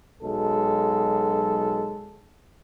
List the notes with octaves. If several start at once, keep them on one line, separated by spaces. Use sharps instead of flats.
B1 F#3 G#3 A4